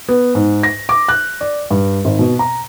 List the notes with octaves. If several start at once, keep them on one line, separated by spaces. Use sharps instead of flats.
B3
G#2
A#6
D6
F#6
D5
G2
G#1
B2
A#5